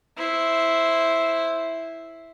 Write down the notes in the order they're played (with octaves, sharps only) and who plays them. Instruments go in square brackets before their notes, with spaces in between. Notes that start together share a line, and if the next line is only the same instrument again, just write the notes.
[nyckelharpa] E4 C5